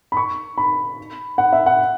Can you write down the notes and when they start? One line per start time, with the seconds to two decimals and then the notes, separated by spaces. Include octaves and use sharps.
0.12 B5
0.17 C#6
0.58 B5
1.38 F#5
1.53 E5
1.66 F#5